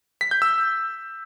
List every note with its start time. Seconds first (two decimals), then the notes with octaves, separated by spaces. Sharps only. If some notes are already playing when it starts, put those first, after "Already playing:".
0.21 B6
0.31 G6
0.42 E6